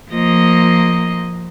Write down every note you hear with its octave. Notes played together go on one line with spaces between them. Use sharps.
F3 A#3 D#5